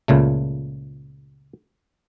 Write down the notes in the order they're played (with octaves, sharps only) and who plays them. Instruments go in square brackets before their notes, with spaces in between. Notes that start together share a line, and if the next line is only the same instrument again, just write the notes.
[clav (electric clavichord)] C#2 A#2 C#3 A3